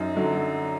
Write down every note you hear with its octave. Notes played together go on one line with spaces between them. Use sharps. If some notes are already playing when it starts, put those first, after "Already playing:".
Already playing: F#2 D#4
D3 F#3